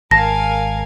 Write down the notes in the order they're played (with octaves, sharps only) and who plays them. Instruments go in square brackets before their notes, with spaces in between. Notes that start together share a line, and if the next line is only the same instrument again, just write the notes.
[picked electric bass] G#1 [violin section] A#4 F5 G#5 [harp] A5 [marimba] A#6